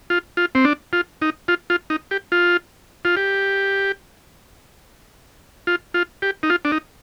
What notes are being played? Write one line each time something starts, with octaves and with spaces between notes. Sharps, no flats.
F4
F4
C4
D4
F4
D#4
F4
F4
D#4
G4
F4
F4
G4
F4
F4
G4
D#4
F4
D4
D#4